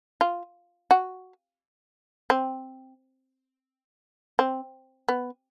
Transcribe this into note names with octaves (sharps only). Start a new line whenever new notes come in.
F4
F#4
C4
C4
B3